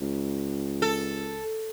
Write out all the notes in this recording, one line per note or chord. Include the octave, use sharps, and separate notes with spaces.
C#2
A4